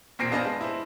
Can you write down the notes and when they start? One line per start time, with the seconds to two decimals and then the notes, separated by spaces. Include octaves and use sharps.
0.19 E1 A#2 C4 A#6 C7 D7
0.32 B3 D4 C5 D#5 F5 G#5
0.45 G#3 A5
0.61 E4 C5